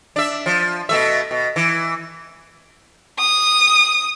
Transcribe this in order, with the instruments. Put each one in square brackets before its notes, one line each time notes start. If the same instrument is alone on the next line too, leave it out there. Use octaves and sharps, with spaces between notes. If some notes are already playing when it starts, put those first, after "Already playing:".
[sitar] D4 E5
F3
B2 A3 E5
B2
E3
[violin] D#6